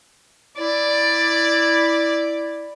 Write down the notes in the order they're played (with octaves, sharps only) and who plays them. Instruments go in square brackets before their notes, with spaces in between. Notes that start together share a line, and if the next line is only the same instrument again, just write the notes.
[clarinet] E4 [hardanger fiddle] D5